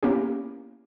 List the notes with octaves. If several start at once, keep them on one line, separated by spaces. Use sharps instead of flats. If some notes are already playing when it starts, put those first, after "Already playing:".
A#3 B3 C#4 E4 G4